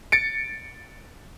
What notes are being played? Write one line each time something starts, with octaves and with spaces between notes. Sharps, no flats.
A6 C#7 D7